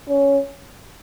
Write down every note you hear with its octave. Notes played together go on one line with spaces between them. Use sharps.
C#4